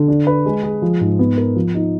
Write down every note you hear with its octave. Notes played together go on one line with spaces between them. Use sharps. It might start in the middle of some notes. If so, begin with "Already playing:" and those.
Already playing: D3
D4
B4
G#3
G#4
F3
G#2
B3
A#4
F3
D#4